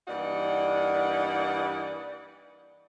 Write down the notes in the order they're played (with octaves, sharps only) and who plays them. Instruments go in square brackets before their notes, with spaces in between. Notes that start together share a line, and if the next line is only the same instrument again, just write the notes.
[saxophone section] G2 E3 A#3 D#4 D5 F#5